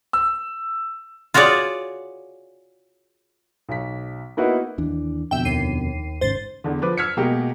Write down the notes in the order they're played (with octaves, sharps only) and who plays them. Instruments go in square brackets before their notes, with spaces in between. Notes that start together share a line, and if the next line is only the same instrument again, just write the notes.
[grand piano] E6
[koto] F4 F#4 G#4 C#5 D5
[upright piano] B1 B6
A#3 B3 D#4 E4 F#4 B4
[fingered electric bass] D#2 E3 D4
[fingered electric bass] F2 B2 D3 [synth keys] E5 G5
[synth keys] D#2 C7 D#7
[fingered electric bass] G#1 G#2 C#3 [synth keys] C5 A6
[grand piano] E2 D3
F3 B4 D6
E6 F6 G#6 B6 C#7
B2 G#3 A#3 G4